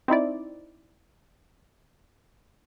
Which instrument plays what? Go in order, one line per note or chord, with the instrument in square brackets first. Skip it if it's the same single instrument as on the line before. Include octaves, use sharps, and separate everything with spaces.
[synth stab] C4 D#4 E4 D5